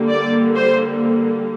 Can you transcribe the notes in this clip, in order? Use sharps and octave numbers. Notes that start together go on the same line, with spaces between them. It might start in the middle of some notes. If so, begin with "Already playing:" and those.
Already playing: D3 G3 A#3
D5
C5